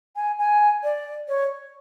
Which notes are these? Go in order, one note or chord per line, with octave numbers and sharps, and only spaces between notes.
G#5
G#5
D5
C#5